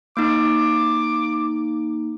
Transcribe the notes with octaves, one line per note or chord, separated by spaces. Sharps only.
A#3 D#4 D6